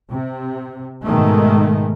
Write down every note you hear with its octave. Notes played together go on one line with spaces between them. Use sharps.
C3
G#2 B2 D#3 G#3 A3